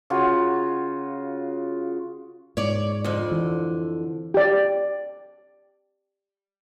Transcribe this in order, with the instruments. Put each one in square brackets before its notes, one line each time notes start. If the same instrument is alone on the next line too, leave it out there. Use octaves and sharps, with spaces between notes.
[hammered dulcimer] C#3 F4 F#4
[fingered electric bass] G#2 [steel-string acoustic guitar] C#5 D5
[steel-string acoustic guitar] F2 D3
[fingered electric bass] E3
[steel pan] G4 D5